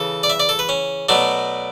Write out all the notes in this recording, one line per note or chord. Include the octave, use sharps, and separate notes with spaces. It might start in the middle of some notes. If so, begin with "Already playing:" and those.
Already playing: C#3 E3 A4
D5
E5
D5
A4
B4
C#4
B2 F#3 A3 D4